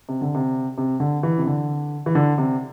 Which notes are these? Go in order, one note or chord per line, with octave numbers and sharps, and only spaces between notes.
C3
D3
C3
C3
D3
E3
C3
D3
E3
D3
C3